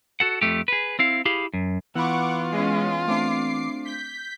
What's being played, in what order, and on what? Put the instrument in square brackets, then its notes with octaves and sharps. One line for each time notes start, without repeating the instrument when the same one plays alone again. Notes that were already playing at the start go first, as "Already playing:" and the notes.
[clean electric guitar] F#4 A4 F#5
F2 F3 A3 G4
G#4 B4
C4 E4 F5
E4 G4 G#4 F5 B5
F#2
[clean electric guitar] E3 B3 [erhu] F4 [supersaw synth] F#5 C#6 D6 [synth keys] B5 E6
[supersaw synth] G#3 C#4 [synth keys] C7 D#7
[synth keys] A3 C4 D4 [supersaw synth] D6 C7
[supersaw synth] G6 B6